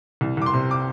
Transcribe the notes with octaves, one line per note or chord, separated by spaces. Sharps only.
C2
C2 D6
C6
C3
D6